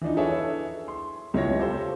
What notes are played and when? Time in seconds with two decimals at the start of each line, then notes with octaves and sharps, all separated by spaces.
0.01 E3 F3 D4 D#4
0.17 E4 G#4 A4 B4 C#5 E5
0.88 C6
1.34 C#2 E4 C#5 A#6
1.58 F4 G4 A4 C5 E5